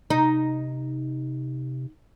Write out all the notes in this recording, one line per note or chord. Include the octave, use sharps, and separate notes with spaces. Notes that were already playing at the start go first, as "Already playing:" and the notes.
C3 D#4